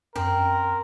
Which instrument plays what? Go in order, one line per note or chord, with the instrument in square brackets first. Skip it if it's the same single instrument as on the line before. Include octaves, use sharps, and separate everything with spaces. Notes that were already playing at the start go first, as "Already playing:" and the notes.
[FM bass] F#2 [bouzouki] C4 [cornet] A#4